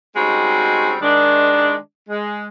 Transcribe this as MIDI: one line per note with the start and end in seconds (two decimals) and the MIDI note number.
0.16 0.95 55
0.16 0.95 56
0.16 0.95 60
0.16 0.95 61
0.16 0.95 63
0.16 0.95 66
1.01 1.75 51
1.01 1.75 56
1.01 1.75 62
2.09 2.46 56